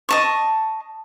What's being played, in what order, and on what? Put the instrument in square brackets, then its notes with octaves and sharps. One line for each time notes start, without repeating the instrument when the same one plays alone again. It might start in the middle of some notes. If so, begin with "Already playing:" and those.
[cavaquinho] D#5 A5 C#6